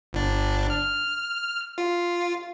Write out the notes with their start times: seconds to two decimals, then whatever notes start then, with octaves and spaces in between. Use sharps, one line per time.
0.13 G1 D4
0.70 F6
1.78 F4